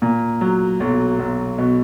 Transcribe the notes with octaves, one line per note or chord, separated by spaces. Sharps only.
A#2
F#3
B1
B1
B2